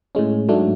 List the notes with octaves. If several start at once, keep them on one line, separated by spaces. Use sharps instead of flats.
A2 G#3 C#4
G#2 F#3 A3 D4